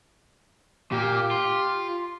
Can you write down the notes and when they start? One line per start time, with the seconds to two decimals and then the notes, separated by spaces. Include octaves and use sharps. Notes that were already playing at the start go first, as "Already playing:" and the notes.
0.92 A#2 A#3 G4
1.31 F4